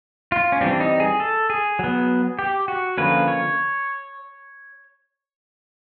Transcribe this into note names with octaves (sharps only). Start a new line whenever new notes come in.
F4
C#4
E3 G3 C4 D4
D#4
G#4
A4
G#4
F#3 B3
G4
F#4
D3 F3 A#3 C#4 B4
C#5